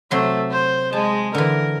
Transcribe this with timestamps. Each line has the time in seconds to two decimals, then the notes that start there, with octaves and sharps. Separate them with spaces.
0.11 C3 F#3 A3 C6
0.51 C5
0.93 G#3 A5
1.35 D3 E3 A#4